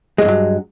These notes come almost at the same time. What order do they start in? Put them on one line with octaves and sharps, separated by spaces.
G#3 E2 G2 F#3